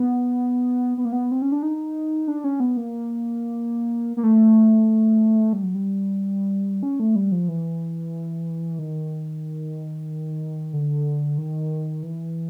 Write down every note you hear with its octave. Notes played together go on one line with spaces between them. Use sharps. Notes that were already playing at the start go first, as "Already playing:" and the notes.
Already playing: B3
B3
A#3
B3
C4
C#4
D4
D#4
D4
C#4
B3
A#3
A#3
A3
G3
F#3
G3
C#4
A3
G3
F3
E3
D#3
D3
D#3
E3